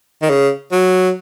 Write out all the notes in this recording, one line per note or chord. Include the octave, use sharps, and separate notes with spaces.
D#3
C#3
F#3